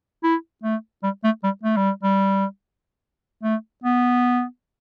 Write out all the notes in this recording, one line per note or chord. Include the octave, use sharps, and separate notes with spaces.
E4
A3
G3
A3
G3
A3
G3
G3
A3
B3